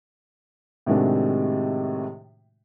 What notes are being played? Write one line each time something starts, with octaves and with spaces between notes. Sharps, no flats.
A2 C3 D#3 G#3 D4 F#4